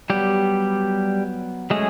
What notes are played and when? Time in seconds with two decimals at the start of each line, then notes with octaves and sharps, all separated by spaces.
0.10 F#3 G3 B3 G4
1.70 F#3 G#3 A3 C#4 G#4